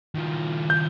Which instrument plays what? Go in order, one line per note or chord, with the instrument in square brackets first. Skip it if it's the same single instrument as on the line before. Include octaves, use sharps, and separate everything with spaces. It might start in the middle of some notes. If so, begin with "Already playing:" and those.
[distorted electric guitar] D#3 F3
[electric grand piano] G6